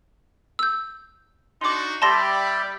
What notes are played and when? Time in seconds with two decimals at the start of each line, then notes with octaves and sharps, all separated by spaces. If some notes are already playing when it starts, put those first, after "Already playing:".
0.59 E6 G6
1.61 D4 D#4 F#4 C6 D6
2.02 G3 G4 D5 E5 A5 B5 C6 A#6